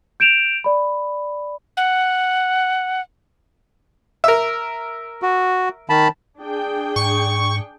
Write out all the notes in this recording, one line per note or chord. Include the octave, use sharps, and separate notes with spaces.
G6 D7 E7 F7
D5 B5
F#5
A#4 E5
F#4
D#3 A5 B5
D4 G#4 G5
G#2 C#6